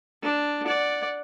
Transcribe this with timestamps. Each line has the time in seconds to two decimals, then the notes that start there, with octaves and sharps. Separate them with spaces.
0.23 D4
0.65 D5 F#5